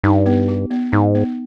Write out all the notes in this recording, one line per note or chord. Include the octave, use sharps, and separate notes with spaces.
G2 D#4
B3
G4
B3
G#2 D#4
B3